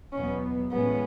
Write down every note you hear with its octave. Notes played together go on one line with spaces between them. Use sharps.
E2 B2 F#3 B3 C#4
A2 E3 G#3 B3 C#4